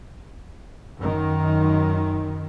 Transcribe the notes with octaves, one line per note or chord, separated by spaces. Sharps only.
F#2 D#3